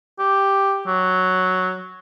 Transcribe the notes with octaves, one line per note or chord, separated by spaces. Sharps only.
G4
F#3